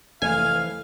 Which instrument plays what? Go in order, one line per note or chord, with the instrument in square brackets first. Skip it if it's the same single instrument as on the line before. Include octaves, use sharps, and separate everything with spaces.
[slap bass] F1 [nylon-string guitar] E3 A3 A4 [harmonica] F5 [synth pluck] G#5